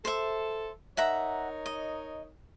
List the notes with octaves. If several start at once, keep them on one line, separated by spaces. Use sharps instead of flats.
A4 C5 E5
D#4 A#4 C#5 E5 F#5 A#5
D#5